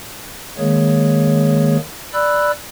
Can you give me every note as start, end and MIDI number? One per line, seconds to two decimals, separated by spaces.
0.58 1.77 51
0.58 1.77 56
0.58 1.77 58
0.58 1.77 68
0.58 1.77 73
2.13 2.52 74
2.13 2.52 83
2.13 2.52 88
2.13 2.52 90